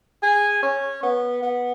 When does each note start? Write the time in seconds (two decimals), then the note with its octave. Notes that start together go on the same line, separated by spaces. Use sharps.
0.23 G#4
0.63 C#4
1.03 B3
1.43 B3